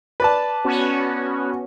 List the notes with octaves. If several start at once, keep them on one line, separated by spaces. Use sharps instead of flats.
B4 D5 A5
B3 C#4 F#4